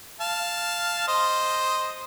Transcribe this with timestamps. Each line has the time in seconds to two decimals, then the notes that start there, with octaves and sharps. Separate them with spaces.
0.21 F5 A5
1.08 C5 D#5